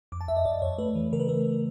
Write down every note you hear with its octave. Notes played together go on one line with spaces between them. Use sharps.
F2 D6
A5
F2 E5
D#5
F2 D5
F2 C#5
A3 B4
E3
C#3 A#4
B4
A3 A#4